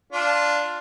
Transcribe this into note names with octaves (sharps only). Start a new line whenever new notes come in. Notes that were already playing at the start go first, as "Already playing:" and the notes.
D4 F4